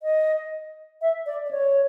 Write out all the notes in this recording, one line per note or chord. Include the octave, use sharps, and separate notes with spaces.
D#5
E5
D5
D5
C#5